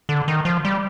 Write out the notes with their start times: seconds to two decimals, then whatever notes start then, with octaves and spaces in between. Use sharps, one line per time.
0.09 D3
0.28 D#3
0.45 F3
0.65 G3